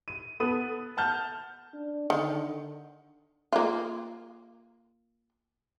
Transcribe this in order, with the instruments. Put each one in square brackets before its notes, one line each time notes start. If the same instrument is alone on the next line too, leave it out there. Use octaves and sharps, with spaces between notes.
[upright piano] D#7
B3 A4 B4 D#6 D#7
F#5 A5 F6 G6
[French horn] D4
[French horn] D3 [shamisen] D#3
[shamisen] A#3 F4